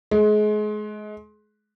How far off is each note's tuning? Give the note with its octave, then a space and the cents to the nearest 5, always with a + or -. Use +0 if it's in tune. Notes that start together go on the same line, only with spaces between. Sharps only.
G#3 +30